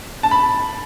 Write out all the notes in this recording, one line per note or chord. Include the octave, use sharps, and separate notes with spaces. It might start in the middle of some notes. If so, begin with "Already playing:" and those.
A5
B5